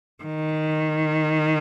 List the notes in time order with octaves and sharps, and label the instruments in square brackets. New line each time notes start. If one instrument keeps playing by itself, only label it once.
[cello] D#3